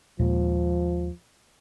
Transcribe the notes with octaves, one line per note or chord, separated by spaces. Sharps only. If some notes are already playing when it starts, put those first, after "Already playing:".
D#2 A#2 F3 G#3